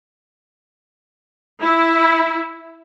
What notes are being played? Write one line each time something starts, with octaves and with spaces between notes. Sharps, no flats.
E4